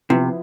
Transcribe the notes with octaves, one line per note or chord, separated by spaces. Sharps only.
C3 F3 B3 E4